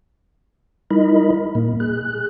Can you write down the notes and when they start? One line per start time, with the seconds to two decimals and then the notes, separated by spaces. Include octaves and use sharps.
0.91 G3 D#4 E4 A#4 D#5 B5
1.55 A#2 A#3
1.80 G#4 F#6